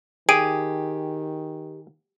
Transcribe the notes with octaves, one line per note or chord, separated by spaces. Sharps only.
D#3 G4 G#4 D7 D#7